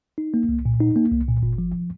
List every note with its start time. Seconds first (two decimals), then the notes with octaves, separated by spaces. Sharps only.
0.18 D#4
0.34 A#3
0.49 C2
0.65 A#2
0.80 D#4
0.96 A#3
1.12 C2
1.28 A#2
1.43 G1
1.58 F3